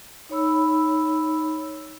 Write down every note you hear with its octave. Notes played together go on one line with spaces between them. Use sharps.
D#4 C#5 B5 E6